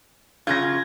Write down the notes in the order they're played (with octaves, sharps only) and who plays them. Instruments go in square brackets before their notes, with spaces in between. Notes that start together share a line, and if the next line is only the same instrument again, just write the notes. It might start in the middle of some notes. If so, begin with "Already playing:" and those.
[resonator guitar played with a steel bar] F#2 C#3 F4 [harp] G#6 A#6